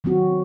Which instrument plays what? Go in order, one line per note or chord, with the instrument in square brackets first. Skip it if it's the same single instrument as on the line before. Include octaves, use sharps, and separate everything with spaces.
[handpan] D#3 F#3 C4 F#4